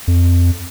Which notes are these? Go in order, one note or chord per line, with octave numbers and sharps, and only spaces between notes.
F2